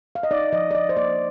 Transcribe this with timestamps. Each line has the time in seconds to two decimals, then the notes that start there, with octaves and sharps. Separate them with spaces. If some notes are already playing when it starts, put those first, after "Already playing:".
0.15 F5
0.23 D#5
0.31 D#4 D5
0.53 F3 D#5
0.71 D5
0.74 F3 D#5
0.89 C5
0.96 A#3 D5